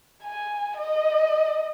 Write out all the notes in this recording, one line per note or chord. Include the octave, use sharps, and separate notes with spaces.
G#5
D#5